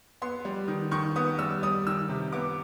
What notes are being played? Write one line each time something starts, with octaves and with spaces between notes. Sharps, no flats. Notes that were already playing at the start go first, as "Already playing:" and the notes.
B3 C6
G3
D#3
D#3 C#6
B3 D#6
G3 E6
G3 D#6
D#3 E6
C3
B3 D6